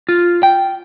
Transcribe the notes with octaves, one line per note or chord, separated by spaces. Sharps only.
F4
G5